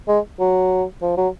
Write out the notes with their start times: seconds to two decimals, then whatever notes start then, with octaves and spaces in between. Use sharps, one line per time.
0.08 G#3
0.40 F#3
1.02 F3
1.17 F#3